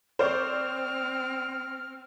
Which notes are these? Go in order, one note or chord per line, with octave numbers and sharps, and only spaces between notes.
C4 C5 D5 C#6 F6